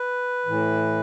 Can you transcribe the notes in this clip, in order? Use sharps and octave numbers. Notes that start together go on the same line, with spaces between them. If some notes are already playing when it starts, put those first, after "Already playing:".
Already playing: B4
A2 E3